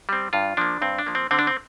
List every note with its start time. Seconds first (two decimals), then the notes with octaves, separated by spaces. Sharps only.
0.09 G3 C4
0.33 G2 F4
0.57 F3 A#3 D4
0.82 G2 C4
0.99 D4
1.07 F3 A#3
1.15 C4
1.31 D3 C4
1.39 D4
1.47 C4